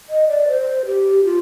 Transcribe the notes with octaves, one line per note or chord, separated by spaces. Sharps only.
D#5
D5
C5
G4
F4